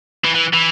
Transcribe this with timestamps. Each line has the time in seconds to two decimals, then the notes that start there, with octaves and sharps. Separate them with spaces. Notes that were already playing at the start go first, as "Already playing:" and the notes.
0.25 E3
0.35 E3
0.53 E3